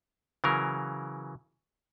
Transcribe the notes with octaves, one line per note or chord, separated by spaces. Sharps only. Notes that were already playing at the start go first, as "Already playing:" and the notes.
C#3 E3 F#3 A#4